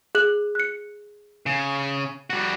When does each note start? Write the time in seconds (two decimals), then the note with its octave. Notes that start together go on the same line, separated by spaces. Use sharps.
0.15 G#4 F#6 F#7
0.55 F#6 C#7
1.46 C#3
2.30 G3 F#4